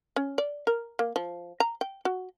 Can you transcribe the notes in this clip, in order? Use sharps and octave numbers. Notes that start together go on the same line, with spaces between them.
C#4
D5
A#4
A#3
F3
A#5
G5
F#4